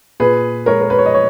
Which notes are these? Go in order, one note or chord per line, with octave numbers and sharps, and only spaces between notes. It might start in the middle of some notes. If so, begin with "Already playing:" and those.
A#2 G#4 B4
G#3 A#4 C#5
A#4
B4
C#5
D#5
C#5